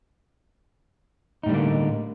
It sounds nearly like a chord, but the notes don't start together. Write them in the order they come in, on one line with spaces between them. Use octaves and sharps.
D#4 A2 G3 D3 A#3